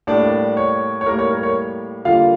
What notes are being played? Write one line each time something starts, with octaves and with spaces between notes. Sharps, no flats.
A2 G3 A#3 D4 D5
C#5
C#5
A2 G3 A#3 A#4
C#5
A#4
C#5
D3 G3 A#3 F4 F5